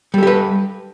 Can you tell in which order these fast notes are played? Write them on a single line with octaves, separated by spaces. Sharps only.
G3 A4 G4 B4